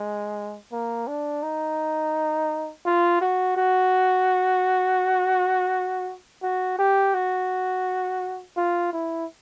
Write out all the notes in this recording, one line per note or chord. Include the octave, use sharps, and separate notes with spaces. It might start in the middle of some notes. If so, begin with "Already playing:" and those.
Already playing: G#3
A#3
D4
D#4
F4
F#4
F#4
F#4
G4
F#4
F4
E4